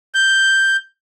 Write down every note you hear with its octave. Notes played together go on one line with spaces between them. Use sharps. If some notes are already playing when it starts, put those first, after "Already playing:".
G6